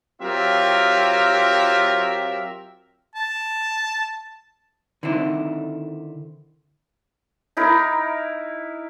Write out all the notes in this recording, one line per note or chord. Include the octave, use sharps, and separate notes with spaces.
F#3 C4 F4 G4 A#4 E5
A5
D3 D#3 C4 E4
D#4 E4 A#4